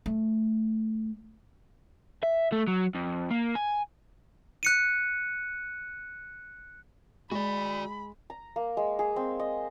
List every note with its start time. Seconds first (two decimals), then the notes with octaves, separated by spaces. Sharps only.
0.06 A3
2.23 E5
2.52 A3
2.67 F#3
2.95 F2
3.30 A#3
3.56 G#5
4.63 F#6 C#7 D#7
7.31 G#3 F#4 D5 B5
8.30 A#5
8.56 A#3
8.77 G#3
8.99 G#4
9.16 C4
9.39 D#5